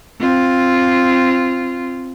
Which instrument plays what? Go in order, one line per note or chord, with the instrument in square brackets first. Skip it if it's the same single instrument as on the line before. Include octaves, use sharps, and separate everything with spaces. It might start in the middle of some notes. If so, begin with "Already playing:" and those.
[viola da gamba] C4 F4